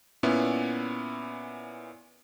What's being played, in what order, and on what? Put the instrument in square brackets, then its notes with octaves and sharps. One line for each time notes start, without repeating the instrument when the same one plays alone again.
[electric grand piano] A#2 B3 C#4 E4